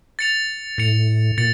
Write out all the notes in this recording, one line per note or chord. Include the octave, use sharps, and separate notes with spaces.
A6 C#7 F7
A2 A6 C#7 F7
A#2 A6 C#7